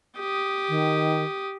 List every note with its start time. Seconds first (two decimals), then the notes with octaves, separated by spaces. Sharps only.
0.18 G4 D#6
0.69 D#3